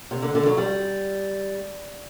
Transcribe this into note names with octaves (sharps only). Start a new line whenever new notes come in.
C3
D3
D3
F#3
G3